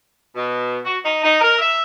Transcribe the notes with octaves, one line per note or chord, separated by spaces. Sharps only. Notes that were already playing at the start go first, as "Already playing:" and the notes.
B2
F#4
D#4
D#4
A#4
E5